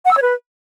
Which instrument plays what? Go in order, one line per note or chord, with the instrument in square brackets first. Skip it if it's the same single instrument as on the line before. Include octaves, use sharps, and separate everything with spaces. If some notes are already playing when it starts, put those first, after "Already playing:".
[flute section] F#5
E6
C#5
B4